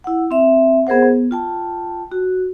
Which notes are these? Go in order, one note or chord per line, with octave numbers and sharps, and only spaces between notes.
E4 F#5
C4 E5
B3 G#4 A#4 C5 F#5
B3
F4 G5 A5
F#4